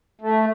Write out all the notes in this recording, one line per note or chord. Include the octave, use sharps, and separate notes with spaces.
A3